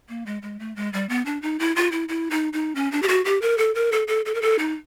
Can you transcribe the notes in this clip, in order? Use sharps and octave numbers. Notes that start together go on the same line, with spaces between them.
A#3
G#3
G#3
A3
G#3
G3
B3
D4
D#4
E4
F4
E4
E4
D#4
D#4
C#4
D4
G4
F#4
G4
A#4
A4
A#4
A4
A4
A4
A#4
A4
D#4